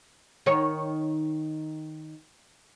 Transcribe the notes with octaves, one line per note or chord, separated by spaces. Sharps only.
D#3 C#5